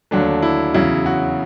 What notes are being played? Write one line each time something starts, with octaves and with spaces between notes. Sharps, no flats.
D#2 D3 F#3 A3 D4
E4
E2 C#3 F#3 E4
F#4